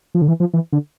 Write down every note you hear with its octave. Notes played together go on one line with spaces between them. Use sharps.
F3
D3
E3
F3
E3
D3